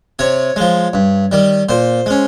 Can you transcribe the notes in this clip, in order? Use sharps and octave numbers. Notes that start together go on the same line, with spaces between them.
C3 C#5
F3 G#3
G2
D#3 G3
A#2 C5
G#3 C#4